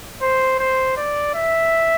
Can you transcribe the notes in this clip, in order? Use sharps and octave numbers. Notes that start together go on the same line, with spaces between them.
C5
C5
D5
E5